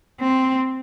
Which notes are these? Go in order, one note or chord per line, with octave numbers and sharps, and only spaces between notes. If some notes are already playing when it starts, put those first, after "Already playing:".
C4